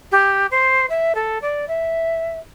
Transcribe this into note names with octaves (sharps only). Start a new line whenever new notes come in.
G4
C5
E5
A4
D5
E5